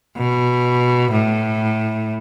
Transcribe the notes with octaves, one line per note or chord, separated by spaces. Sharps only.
B2
A2